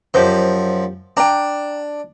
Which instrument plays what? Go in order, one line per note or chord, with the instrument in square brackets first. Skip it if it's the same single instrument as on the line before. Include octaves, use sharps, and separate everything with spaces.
[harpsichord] F#2 F3 [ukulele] G4 C5
[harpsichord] D4 [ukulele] G5 A#5